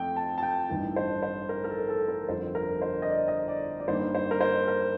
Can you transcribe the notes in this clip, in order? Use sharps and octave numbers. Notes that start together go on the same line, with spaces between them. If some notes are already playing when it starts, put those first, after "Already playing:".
Already playing: F2 A3 C4 G5
A5
A5
G5
A1 G2 D#3
C5
C5
A#4
A#4
A4
A4
A#4
G1 F2 D3 C5
A#4
C5
D#5
D5
D#5
D5
D5
G2 D#3 A#3 C5
C5
A#4
C5
A#4